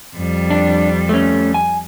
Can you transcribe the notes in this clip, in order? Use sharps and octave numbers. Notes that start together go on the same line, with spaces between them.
F2 G3
D4
A3 C#4
G#5